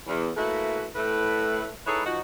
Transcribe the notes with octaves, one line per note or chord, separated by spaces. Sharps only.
E2
A3 A#3 E4 F#4 B4
A2 A3 B4
D#4 E4 G#4 A4 B4 C#5
F3 D#4 F#4